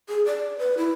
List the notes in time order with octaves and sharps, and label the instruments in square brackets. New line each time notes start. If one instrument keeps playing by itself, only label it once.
[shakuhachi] G#4
D5
B4
E4